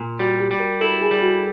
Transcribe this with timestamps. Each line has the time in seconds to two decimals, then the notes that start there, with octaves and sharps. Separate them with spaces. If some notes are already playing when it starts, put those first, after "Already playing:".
Already playing: A#2
0.19 G3 F#4
0.40 G4
0.51 G3
0.60 A#4
0.81 E4 A4
1.01 G#4
1.11 G3
1.22 F#4